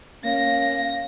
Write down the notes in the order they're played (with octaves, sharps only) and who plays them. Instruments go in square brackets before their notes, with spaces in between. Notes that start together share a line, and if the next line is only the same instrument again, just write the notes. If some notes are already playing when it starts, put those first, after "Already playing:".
[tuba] A#3 [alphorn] C#4 [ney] F5 [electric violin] A#6